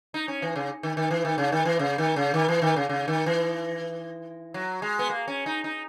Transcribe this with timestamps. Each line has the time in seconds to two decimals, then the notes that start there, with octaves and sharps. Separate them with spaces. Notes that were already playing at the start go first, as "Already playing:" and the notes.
0.14 D#4
0.28 C#4
0.42 E3
0.56 C#3
0.83 D#3
0.97 D#3
1.11 E3
1.25 D#3
1.38 C#3
1.52 D#3
1.65 E3
1.79 C#3
1.98 D#3
2.16 C#3
2.34 D#3
2.48 E3
2.62 D#3
2.76 C#3
2.89 C#3
3.08 D#3
3.26 E3
4.54 F#3
4.82 G#3
4.99 B3
5.10 A#3
5.28 C#4
5.46 D#4
5.64 D#4